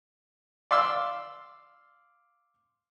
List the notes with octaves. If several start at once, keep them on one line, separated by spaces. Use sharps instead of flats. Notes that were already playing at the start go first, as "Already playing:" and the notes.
D5 F5 C6 E6